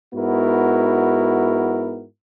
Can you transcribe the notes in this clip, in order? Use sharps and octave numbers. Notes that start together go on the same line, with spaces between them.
G#2 B3 E4 F#4 A#4